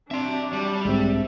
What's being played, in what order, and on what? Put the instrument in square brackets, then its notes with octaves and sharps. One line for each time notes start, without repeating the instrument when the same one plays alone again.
[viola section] F#3 D4 G4 [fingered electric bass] C4 [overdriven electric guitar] E5 C6
[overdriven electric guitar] G3
[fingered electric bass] B1 G#2 [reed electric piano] G#3 C4 [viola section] E5